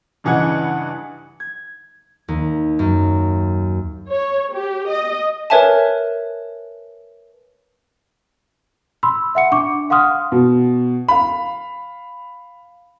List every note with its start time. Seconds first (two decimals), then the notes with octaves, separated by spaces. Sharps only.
0.24 G2 C#3 E3 D#5 F#5 G#6
1.40 G#6
2.28 D#2
2.79 F#2
4.09 C#5
4.53 G4
4.90 D#5
5.50 A#4 B4 C#5 E5 G#5 A5
9.03 B5 C6 E6
9.35 E5 F#5 C#7
9.52 D4 C#6 D6
9.90 F5 F#5 C6 D#6 F6
10.32 B2
11.08 F5 B5